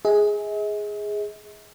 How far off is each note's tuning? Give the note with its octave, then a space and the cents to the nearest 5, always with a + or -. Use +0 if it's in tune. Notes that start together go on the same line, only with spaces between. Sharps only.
G#4 +0 D#5 +45